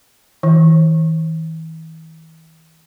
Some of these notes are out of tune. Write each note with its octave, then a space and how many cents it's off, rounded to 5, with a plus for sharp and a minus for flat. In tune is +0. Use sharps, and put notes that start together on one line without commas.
E3 -40